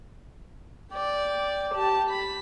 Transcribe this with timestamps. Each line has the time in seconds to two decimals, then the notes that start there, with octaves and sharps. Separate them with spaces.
0.92 D5 G5
1.74 G4 A5
2.09 B5